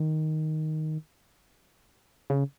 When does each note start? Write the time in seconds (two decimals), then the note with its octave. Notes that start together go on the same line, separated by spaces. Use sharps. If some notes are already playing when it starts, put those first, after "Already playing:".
Already playing: D#3
2.30 C#3